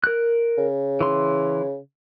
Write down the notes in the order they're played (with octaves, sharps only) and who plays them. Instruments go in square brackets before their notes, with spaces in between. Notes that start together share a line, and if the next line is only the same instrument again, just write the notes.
[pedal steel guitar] A#4 F#6
[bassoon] C#3
[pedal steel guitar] E3 C6